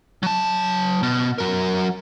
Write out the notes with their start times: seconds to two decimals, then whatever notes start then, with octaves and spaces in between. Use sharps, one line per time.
0.23 F#3 A5
1.03 B2
1.38 F#3 A#4